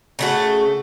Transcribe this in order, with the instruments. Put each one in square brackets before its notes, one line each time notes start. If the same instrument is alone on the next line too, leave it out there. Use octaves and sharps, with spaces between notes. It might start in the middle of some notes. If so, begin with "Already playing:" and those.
[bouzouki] C#3 A3 F#4